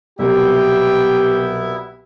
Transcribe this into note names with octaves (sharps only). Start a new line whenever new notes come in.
C2 B2 F#3 B3 E4 G4 E5 G5